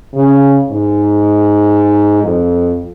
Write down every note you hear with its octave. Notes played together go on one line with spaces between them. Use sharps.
C#3
G#2
F2